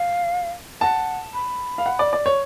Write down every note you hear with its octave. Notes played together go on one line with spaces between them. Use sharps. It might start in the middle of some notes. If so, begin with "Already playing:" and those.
Already playing: F5
F#5 A5
B5
F5
F#5
D5
D5
C#5